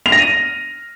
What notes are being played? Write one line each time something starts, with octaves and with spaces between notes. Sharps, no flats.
F7
A#6
D#7